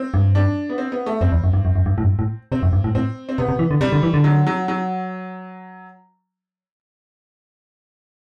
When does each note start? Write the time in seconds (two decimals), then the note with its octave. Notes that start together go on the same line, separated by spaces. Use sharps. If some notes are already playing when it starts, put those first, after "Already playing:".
Already playing: C4
0.14 G2
0.35 D4
0.69 B3
0.78 C4
0.92 B3
1.06 A3
1.21 F#2 C4
1.32 E2
1.44 F#2
1.53 G2
1.65 F#2
1.76 F#2
1.86 G2
1.98 A2
2.03 F#2
2.08 G2
2.19 A2
2.52 C3 C4
2.63 F#2
2.73 G2
2.84 A2
2.95 A2 C4
3.29 C4
3.38 C3 B3
3.49 C3
3.59 E3
3.71 D3
3.81 C3 G3
3.92 D3
4.03 E3
4.14 D3
4.24 F#3
4.47 F#3
4.68 F#3